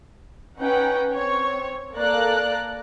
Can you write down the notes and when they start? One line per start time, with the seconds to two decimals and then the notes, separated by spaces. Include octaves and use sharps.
0.58 C#4 D#4 B4 F#5 G5
1.13 C4 C#5
1.96 A#3 A4 D5 A#5 F#6